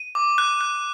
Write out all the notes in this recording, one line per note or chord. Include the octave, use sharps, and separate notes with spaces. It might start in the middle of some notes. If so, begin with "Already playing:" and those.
Already playing: D#7
D6
F#6
F#6